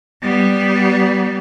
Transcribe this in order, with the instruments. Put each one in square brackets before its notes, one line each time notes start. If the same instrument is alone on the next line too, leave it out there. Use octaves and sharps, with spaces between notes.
[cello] G3 B3